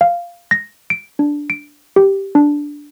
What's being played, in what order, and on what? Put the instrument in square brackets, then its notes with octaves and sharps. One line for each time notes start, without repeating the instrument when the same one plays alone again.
[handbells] F5
A#6
D7
D4
D7
G4
D4